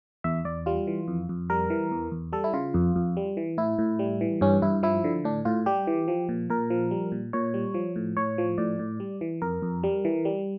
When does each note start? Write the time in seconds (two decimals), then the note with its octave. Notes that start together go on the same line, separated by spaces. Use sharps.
0.24 E2 E5
0.45 E2 D5
0.66 G3 F4
0.87 E3
1.08 F2
1.29 F2
1.50 G3 A#4
1.70 E3
1.91 E2
2.12 E2
2.33 G3 A4
2.44 E4
2.53 C#3 F4
2.74 F2
2.96 F2
3.17 G3
3.37 E3
3.58 A2 E4
3.78 A2
3.99 G3
4.21 E3
4.41 G2 C#4
4.62 G2 E4
4.83 F3 E4
5.04 D3
5.24 A2 D4
5.45 A2 F4
5.66 G3 G4
5.87 E3
6.08 F3
6.29 A#2
6.50 A#2 A#4
6.70 F3
6.91 G3
7.12 A#2
7.33 A#2 C#5
7.54 G3
7.74 F3
7.96 A2
8.17 A2 C#5
8.38 F3
8.58 A2 D5
8.79 A2
9.00 G3
9.21 E3
9.42 F2 A#4
9.62 F2
9.84 G3
10.05 E3
10.25 G3